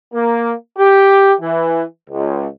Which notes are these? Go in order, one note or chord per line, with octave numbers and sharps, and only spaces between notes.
A#3
G4
E3
C#2